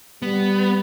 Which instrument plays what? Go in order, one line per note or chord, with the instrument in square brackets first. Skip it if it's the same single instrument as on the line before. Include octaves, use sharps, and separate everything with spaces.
[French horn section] G3 [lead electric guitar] B3